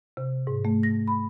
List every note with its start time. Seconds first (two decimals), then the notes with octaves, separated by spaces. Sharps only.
0.17 C3
0.47 G#2
0.65 A3
0.83 A#6
1.08 B5